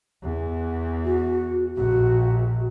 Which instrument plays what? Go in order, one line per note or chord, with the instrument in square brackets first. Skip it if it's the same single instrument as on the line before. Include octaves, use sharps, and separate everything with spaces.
[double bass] E2
[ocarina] F#4
[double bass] A#1 [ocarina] F#4